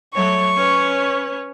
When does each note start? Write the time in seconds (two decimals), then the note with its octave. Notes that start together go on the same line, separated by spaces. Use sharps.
0.13 F#3 A3 C#5 C#6
0.54 C#4 B4 C#5